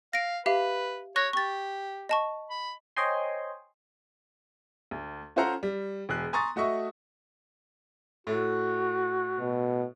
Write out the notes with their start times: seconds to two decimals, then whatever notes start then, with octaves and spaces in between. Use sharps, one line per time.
0.13 F5 A#6 D7
0.46 G4 B4 E5 F5
1.16 C#5 C#6 F#6 A#6
1.33 G4 C#6 A6
2.09 D#5 A5 C#6
2.50 B5
2.96 C5 C#5 D#5 G5 G#5 C6
4.91 D2
5.36 C#4 F4 A4 C5 F#5 A#5
5.63 G3
6.09 E1 G#4 F#6
6.33 G#5 A#5 C6 C#6 D#6 A6
6.56 A3 F#4 D#5 E5 C#6
8.27 A2 A3 F#4
9.40 B2